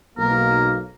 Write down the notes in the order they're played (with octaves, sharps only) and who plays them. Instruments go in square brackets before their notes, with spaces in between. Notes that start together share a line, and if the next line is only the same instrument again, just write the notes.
[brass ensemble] B1 A#3 [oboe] A#4